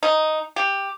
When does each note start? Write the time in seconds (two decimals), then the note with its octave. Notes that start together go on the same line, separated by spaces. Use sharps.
0.03 D#4
0.56 G4